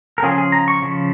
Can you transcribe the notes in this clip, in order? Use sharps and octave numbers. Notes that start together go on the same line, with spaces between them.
A#4
C#3 F3 C#4 F4 G#4
G#4
A#5
C#6
C#3 F3